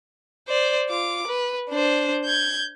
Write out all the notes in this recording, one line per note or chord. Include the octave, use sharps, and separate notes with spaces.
C5 D5
F4 D6
B4
D4 C5
G6 G#6